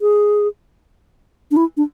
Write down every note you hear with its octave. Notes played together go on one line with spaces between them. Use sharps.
G#4
D4
E4
D4